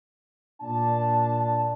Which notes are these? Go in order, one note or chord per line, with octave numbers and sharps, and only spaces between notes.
A#2 D4 A5